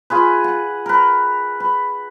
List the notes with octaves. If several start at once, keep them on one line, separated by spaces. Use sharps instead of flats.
F4 G#4 B4
F#5
A#4 B4
B4